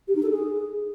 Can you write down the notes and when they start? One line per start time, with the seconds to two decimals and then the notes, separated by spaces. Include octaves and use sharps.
0.08 G4
0.15 D#4
0.23 A4
0.30 G#4